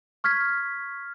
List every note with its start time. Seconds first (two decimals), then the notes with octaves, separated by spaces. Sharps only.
0.24 C#6 F6 G#6 B6